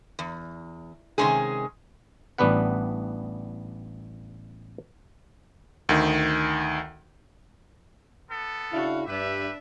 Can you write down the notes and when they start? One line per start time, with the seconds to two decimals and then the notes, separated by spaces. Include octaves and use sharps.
0.19 E2
1.18 C3 D#3 G#3 C#4 G#4
2.38 A1 G3 B3 D4 B4 F#5
5.89 D2 D#3
8.29 B3 A4
8.71 C#3 D4 E4 F#4 F5
9.07 G2 D4 G4 B4 E5